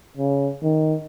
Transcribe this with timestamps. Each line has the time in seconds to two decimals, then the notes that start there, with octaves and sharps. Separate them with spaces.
0.17 C#3
0.63 D#3